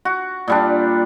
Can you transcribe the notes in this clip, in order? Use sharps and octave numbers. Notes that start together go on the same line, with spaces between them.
F#4
A#2 G3 D4